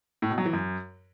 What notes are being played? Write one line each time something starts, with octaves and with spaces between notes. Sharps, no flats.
A2
B2
F#3
E3
F#2